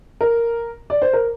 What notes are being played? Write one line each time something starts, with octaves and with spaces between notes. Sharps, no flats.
A#4
D5
C5
A#4